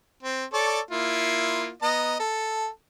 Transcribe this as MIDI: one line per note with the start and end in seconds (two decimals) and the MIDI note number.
0.23 0.45 60
0.53 0.80 69
0.53 0.80 73
0.53 0.80 74
0.91 1.70 58
0.91 1.70 64
0.91 1.70 65
1.82 2.16 59
1.82 2.16 75
1.82 2.16 82
2.20 2.68 69